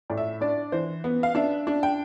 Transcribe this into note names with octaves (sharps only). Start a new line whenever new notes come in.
A2 D5
E5
D4 D5
E3 C5
B3
F5
D4 E5
D4
G5